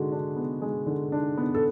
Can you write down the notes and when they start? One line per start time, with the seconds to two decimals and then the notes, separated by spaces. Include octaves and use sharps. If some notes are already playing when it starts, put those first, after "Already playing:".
Already playing: D3 G#3 F#4
0.12 D4
0.36 B3
0.62 G#3
0.86 D3
1.12 D4
1.38 B3
1.54 A4